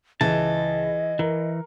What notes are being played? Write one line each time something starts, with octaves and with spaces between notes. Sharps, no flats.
C#2 E3 D#5 A5
E3 A#4